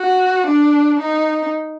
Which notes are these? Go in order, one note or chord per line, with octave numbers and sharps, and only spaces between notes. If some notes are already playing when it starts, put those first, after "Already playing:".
Already playing: F#4
D4
D#4